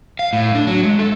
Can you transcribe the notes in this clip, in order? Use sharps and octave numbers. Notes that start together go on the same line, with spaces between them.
F5
A2
D4
F#3
G#3
A4